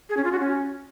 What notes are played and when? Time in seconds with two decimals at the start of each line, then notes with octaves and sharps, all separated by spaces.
0.09 G#4
0.17 C#4
0.24 F4
0.32 F#4
0.39 C#4